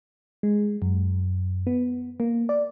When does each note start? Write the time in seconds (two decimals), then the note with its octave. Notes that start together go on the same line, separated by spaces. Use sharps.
0.43 G#3
0.82 F#2
1.67 B3
2.20 A#3
2.49 D5